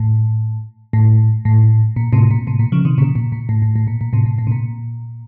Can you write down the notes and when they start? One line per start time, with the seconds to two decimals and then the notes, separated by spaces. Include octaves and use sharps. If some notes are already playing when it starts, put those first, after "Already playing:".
Already playing: A2
0.93 A2
1.45 A2
1.96 A#2
2.13 A2 C3
2.31 A#2
2.47 A2 C3
2.59 A#2
2.72 C#3 F3
2.85 C3 D#3
2.98 A#2 C#3
3.15 A#2
3.32 A#2
3.49 A2
3.62 A2
3.76 A2
3.87 A#2
4.01 A#2
4.13 A2 C3
4.26 A2
4.38 A2
4.47 C3
4.52 A#2